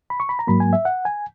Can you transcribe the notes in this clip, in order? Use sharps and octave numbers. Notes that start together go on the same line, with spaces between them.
B5
C#6
B5
A#5
G#2 F#3 A#3 B5
G#5
E5
F#5
G#5